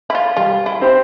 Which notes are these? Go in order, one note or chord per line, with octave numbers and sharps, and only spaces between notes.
E4
F4
G3 F4
E4
C4 G4 C5